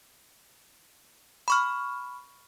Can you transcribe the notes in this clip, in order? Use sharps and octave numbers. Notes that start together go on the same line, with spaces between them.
B5 C#6 F6